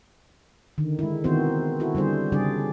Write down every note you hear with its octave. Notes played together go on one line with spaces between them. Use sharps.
D3 D#3
G#3 E4
D#3 E3 B3 C4 F#4 C5
E4 F#4 A4
D3 G3 G#4 C5
C#3 G3 D4 G#4 D5